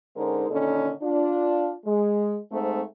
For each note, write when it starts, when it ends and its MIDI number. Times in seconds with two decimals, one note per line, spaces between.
0.16 0.47 50
0.16 0.47 56
0.16 0.47 61
0.16 0.47 63
0.16 0.47 70
0.16 0.47 72
0.50 0.92 46
0.50 0.92 50
0.50 0.92 51
0.50 0.92 61
0.50 0.92 63
0.50 0.92 69
1.02 1.73 62
1.02 1.73 65
1.85 2.37 56
2.51 2.82 44
2.51 2.82 57
2.51 2.82 60